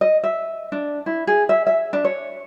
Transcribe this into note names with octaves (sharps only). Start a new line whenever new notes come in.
D#5
E5
D4
E4
G#4
E5
E5
D4
C#5